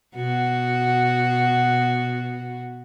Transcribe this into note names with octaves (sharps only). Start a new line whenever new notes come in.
B2 F#4